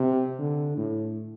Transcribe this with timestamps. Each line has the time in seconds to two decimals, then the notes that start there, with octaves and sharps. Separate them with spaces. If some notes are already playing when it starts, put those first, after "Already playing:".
Already playing: C3
0.39 D3
0.77 A2